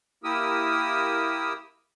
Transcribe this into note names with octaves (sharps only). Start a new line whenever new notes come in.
A#3 E4 G4 A#4 D#6 E6